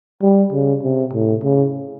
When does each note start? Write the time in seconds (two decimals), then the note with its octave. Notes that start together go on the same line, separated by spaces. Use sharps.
0.22 G3
0.52 C#3
0.83 C3
1.13 A2
1.44 C#3